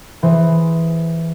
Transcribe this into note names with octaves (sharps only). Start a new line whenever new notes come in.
E3 G#4 C5